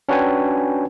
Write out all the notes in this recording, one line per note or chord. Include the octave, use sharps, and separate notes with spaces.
C#4 D4 F#4 B4 G5 G#5